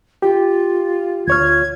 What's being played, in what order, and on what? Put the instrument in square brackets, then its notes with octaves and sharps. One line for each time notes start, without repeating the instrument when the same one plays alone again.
[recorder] F4 [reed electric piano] G4
[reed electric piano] D2 C#5 F6 [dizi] G#6